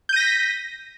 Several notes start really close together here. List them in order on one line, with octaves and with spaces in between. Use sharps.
G6 D#7 A#6 B6